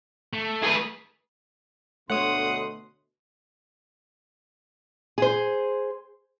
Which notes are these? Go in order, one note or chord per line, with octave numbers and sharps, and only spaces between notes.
A3
G#4 B4
D2 B2 A3 C#5 F#5 C6 D#6
G#4 C5